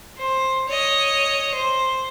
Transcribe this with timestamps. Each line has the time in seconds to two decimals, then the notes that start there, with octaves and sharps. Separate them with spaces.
0.18 C5
0.68 C#5 D#5
1.54 C5